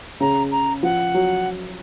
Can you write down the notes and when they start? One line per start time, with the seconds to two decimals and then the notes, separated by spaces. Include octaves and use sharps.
0.20 C#3 A#5
0.51 A#5
0.83 F3 F#5
1.14 F#3